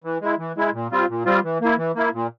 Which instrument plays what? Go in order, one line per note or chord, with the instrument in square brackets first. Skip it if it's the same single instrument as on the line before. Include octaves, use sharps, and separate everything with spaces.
[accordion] E3
G#3 E4
E3
G#3 E4
A#2
G3 C4 F4
A#2
G3 C4 F4
E3
A#3 E4
E3
A#3 E4
A#2